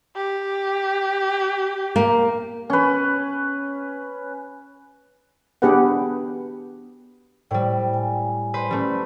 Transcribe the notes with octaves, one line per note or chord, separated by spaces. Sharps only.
G4
A#3
C#4 B4
B3 D4 G4 G#4 B4 F#5
A2 G3 C5 D5 G5
G#5
B4 C5
G3 A3 C#4